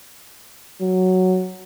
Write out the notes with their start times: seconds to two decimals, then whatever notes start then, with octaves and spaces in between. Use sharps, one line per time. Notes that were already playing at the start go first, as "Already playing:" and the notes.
0.80 F#3